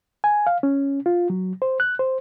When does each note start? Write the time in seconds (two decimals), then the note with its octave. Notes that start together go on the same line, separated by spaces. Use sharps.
0.24 G#5
0.47 F5
0.63 C#4
1.06 F4
1.30 F#3
1.62 C5
1.80 F#6
1.99 C5